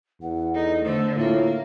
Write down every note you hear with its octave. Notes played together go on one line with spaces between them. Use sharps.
E2 F#5
D#4 A4
D3 A3 C5
A2 A#3 F4